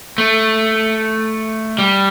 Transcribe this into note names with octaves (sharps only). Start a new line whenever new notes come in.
A3
G3